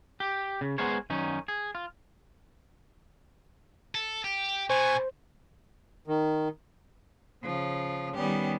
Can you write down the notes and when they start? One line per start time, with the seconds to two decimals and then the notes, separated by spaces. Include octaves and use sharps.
0.20 G4
0.61 C#3
0.78 G#3 B3 G#4 A#4 C5 C#5
1.10 F#2 D#3 C#4 D#4
1.48 G#4
1.75 F4
3.95 A4
4.24 G4
4.70 B2 C5 G#5 C#6
6.07 D#3
7.42 C#3 F3
8.14 D#3 G3 B3 C#4 G4